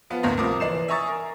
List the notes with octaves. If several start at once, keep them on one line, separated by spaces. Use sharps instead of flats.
F3 B3 F4
G1 D2 A2 A#3 A#5 C6
C2 F3 A#4 D6 D#6
E3 D5 C7 E7
E5 G#5 A#5 C#6 D#6 A6
A#4